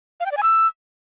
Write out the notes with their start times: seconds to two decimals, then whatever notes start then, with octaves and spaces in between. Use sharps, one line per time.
0.20 F5
0.26 G5
0.32 D5
0.37 G#5
0.43 E6